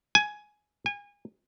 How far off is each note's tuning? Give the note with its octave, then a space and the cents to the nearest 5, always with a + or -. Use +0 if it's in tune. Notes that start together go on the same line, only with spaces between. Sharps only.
G#5 +10
G#5 -30